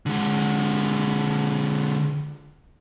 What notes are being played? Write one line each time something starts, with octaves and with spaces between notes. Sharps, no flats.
D3 G#3